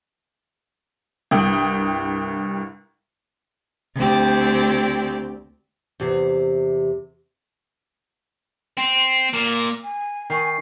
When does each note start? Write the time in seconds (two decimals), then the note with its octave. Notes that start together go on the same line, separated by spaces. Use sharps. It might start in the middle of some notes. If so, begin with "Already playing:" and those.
1.31 C2 G2 G5 D#6 F#7
3.97 D2 C4 G4 D5
6.00 E2 C3
8.78 C4
9.33 A#2
9.84 G#5
10.30 D#3 C#6 C7